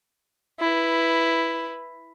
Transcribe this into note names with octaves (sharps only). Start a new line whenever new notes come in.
E4 B4